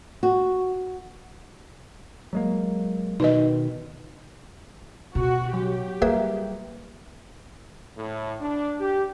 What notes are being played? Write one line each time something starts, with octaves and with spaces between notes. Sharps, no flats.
F#4
F#3 G#3 A#3
B2 D#3 D#4 B4 D#5
B2 D#3 F#4
F#3 G4
G3 A#3 G#4 B4 E5
A2
D4
G4